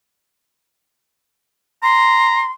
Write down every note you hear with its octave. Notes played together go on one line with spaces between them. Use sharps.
A#5 C6